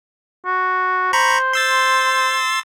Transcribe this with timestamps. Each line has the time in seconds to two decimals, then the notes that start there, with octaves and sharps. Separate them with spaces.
0.46 F#4
1.13 C5 A#5 B5 C#6
1.53 C6 E6 A6